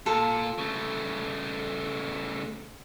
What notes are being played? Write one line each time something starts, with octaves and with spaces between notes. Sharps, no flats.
A#2 F4 A4
C#3 A3